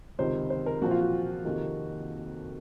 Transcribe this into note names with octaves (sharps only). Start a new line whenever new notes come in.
C#2 C3 D#3 C5
C5
A#4
A#2 F3 C4 F#4
F4
F#4
F2 C3 D#3 A#3